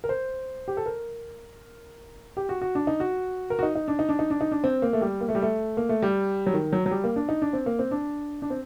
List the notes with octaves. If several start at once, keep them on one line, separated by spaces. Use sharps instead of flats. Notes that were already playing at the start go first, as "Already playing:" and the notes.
A#4
C5
G4
A4
A#4
G4
F#4
F#4
D4
D#4
F#4
A#4
F#4
D#4
D#4
D4
D#4
D4
D#4
D4
D#4
D4
C4
A#3
A3
G3
A#3
A3
G3
A3
A#3
A3
G3
F#3
D#3
F#3
F#3
G3
A#3
D4
D#4
D4
C4
A#3
C4
D4
D4
C4